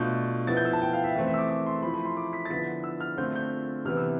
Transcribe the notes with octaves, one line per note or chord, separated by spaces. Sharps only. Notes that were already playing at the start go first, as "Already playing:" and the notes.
Already playing: B2 A3 D4 F4 G6
F3 B3 E4 A6
G6
E6
A5
G5
F5
E5
E3 A3 C4
E5
E6
D6
D6
C6
F3 A3 E4 B5
B5
C6
D6
B6
A6
D3 F3 B3 E4 B6
E6
F6
D3 A3 C4 F4 G6
G6
C3 E3 B3 E4 F6
E6